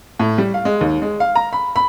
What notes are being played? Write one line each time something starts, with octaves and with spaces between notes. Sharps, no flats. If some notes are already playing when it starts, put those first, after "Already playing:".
A2
G3
F5
G#3
D#2
G#3
F5
A#5
B5
B5